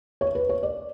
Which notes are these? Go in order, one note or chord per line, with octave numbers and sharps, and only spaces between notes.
C#5
B4
C#5
D5